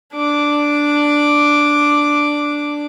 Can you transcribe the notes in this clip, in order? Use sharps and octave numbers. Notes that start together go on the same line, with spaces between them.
D4 D6